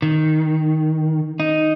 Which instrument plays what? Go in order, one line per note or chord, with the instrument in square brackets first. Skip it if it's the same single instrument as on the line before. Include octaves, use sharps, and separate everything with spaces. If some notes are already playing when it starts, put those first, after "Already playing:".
[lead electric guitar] D#3
D#4